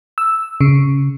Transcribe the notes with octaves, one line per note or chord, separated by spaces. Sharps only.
E6
C#3